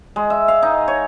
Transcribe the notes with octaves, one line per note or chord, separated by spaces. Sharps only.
G#3
E5
F5
D#4
C#5